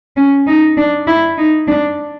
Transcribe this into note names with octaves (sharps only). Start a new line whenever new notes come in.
C#4
D#4
D4
E4
D#4
D4